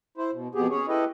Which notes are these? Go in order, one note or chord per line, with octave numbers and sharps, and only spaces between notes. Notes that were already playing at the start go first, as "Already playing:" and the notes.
E4 C5
B2
F2 B2 B3 G4 G#4
C#4 G#4 C#5
E4 G4 A4 B4 D#5